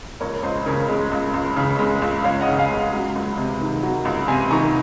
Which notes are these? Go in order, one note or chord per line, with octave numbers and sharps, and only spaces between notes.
C#2 A#4 C#5
C#2 C5 D#5
C#3 A#4 C#5
G#3
C#2
C#2
C#3
G#3
C#2
C#2 C#5 F5
D#5 F#5
C#3
F5 G#5
G#3
F#3
C#2
C3
D#3
F#3
C#2
C3 G#5 C6
D#3 A#5 C#6